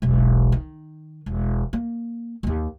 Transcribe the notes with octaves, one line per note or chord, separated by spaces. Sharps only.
E1 B1
D#3
E1
A#3
D#1 D#2